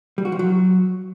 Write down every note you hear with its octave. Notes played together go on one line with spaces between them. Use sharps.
G3
F#4
F3
F#3